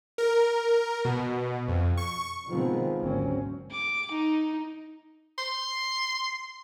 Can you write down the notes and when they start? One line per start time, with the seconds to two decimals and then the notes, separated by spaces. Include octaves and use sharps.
0.18 A#4
1.05 B2
1.68 F2
1.97 C#6
2.49 B2 D#3 F3 G#3 B3 C4
2.98 G#1 D2 F#3 A#3 C4 C#4
3.71 D6
4.11 D#4
5.38 C6